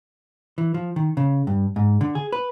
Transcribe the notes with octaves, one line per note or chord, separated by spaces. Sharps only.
E3
F3
D#3
C#3
G2
G#2
D3
G#4
B4